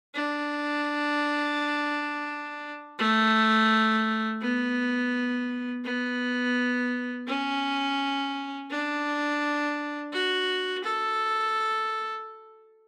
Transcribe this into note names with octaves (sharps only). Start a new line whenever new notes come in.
D4
A3
B3
B3
C#4
D4
F#4
A4